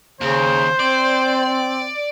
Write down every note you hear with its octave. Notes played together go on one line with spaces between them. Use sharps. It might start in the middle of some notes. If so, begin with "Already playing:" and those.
D#2 C#3 C5
C4 D5